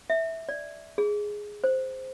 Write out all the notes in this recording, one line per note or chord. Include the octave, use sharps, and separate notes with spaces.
E5
D5
G#4
C5